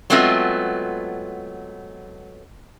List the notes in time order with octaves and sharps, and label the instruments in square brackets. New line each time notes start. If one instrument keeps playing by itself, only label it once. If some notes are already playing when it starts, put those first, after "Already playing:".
[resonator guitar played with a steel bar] F#3 G#3 A3 B3 C4 F4